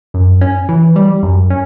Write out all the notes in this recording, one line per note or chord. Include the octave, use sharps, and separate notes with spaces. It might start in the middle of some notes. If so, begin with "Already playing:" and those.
F#2
C#4
E3
G3
F#2
C#4